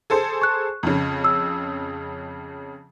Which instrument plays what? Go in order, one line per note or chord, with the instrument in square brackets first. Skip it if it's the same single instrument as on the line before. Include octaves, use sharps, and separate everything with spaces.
[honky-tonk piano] G#4 A4 C5
[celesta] C#6 F#6
[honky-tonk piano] F2 C#3
[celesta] E6